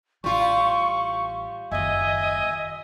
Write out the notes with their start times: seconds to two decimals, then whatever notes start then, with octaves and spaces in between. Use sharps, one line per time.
0.24 A1 G3 F4 C#6
1.72 F#1 D#2 D#5 E5 G#5